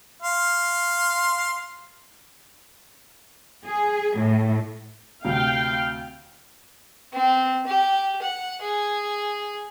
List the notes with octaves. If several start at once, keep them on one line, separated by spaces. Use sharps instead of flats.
F5 C6
G#4
A2
D2 C3 F5 G5
C4
G4
F#5
G#4